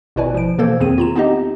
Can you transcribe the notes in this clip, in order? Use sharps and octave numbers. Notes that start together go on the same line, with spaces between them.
G#1 B2 E4 B4 D5 G#5
F3 D7
B2 E3 A#3 A4 C5 G#6
E2 D#3 C4 G#4 D#7
F4 A#5 E7
B3 C4 D#4 G4 D#5